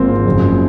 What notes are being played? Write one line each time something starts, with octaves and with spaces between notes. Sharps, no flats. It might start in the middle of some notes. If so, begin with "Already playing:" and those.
Already playing: G#1 G#2 F3 A#3 C4
F#1 F#2 F3